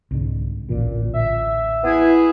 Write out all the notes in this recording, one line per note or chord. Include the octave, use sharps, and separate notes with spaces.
C2 G#2 D3
A1 D2 A#2 E3
E5
B3 E4 G#4